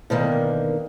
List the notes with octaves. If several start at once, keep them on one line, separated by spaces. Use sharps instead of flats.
B2 D3 D#3 A#3